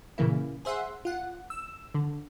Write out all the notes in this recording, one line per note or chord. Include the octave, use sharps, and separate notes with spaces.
A#2 C#3 E3 A#3 E4
G#4 C5 E5 F#5 C6
F4 F#5
E6
D3